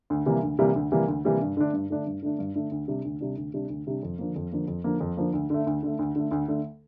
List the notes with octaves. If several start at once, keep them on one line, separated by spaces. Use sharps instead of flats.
D2
C3 E3 G3 A#3
D2
C3 E3 G3 A#3
D2
C3 E3 G3 A#3
D2
C3 E3 G3 A#3
G2
D3 A3 D4
G2
D3 A3 D4
G2
D3 A3 D4
G2
D3 A3 D4
D2
C3 G3 D4
D2
C3 G3 D4
D2
C3 G3 D4
D2
C3 G3 D4
F2
D3 F3 A#3
F2
D3 F3 A#3
F2
D3 F3 A#3
F2
D3 F3 A#3
D2
D3 A3
D2
D3 A3
D2
D3 A3
D2
D3 A3